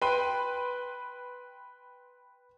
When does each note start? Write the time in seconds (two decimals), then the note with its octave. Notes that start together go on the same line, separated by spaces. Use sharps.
0.02 B4 G5 C6 D#7